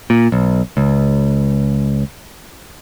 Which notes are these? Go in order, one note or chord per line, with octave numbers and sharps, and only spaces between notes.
A#2
B1
C#2